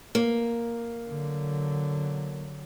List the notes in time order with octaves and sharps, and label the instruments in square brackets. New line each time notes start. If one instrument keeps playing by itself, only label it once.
[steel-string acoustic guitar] A#3
[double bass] D3 F#3